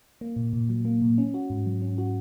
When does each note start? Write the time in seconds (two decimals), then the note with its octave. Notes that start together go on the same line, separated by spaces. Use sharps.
0.21 A#3
0.36 A#2
0.53 A#2
0.69 F#3
0.85 A#3
1.02 A#2
1.18 C#4
1.34 F#4
1.50 G#2
1.66 F#3
1.82 C#4
1.98 F#4